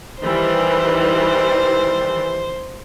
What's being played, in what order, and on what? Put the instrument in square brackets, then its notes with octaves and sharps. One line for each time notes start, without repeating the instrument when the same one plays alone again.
[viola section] D#3 E3 G3 [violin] C5